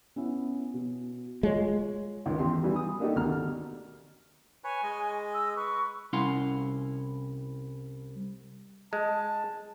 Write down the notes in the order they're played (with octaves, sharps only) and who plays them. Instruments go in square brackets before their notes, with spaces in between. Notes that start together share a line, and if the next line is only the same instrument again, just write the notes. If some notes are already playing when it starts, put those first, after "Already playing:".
[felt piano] B3 C#4 E4
B2
[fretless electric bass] G#3 [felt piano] F4 C#5
[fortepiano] C#2 D#3 C6
E2 G4 C6
E3 G3 F#4
D#6
A#3 D4 D#4 F#4 G4 A4
D2 B2 D#3 A#5 F6
[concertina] B4 C#5 [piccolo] G#5
[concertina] G#3 D#5
[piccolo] E6
[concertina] B4 [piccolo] C#6
[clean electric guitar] C2 C#4 E4 F5 F#5 C6
[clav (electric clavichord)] G#3 [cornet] A5